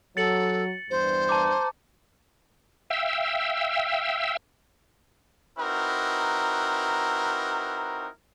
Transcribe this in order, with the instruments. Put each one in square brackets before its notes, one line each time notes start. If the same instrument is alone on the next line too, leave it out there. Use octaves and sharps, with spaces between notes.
[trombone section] F#3 [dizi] A4 [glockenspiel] A6 C#7 F#7
[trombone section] E2 G2 [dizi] C5
[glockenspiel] A5 A#5 D6
[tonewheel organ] E5 F5 G5 E6
[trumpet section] C4 D#4 E4 F#4 A#4 B4